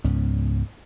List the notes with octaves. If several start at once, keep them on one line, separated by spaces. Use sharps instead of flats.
C#2 G#2 B3 C#4